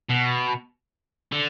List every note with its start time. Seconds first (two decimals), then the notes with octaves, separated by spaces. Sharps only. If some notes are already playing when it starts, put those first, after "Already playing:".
0.09 B2
1.32 D3